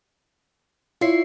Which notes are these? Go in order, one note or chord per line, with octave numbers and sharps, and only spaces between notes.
E4 F4 C#5 C7